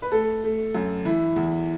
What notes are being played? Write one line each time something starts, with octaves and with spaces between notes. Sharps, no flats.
B4
A3 A4
A3
F#2
E3 E4
E2